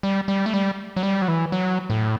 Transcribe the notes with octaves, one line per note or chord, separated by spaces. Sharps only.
G3
G3
A3
G3
F#3
G3
F#3
E3
F#3
A2